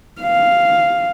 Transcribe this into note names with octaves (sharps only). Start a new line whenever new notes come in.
F5